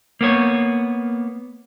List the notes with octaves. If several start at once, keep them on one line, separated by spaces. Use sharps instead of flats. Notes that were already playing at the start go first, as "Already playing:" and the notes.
A#3 B3 C#5